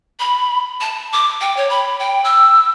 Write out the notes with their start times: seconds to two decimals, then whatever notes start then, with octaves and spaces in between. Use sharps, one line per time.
0.19 B5
0.81 A5
1.13 D6
1.41 G5
1.57 C#5
1.70 B5
1.99 G5
2.24 E6